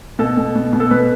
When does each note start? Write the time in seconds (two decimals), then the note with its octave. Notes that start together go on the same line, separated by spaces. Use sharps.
0.19 B2 A4
0.37 B2
0.56 B2
0.73 B2
0.80 A4
0.91 B2 B4